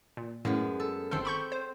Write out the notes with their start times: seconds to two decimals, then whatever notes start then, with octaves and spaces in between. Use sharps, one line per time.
0.17 A#2
0.45 F#2 A2 G#3 B3
0.80 A4
1.11 G1 D#3 C4 A4 G5 C6
1.25 B5 C#6 G6
1.52 C5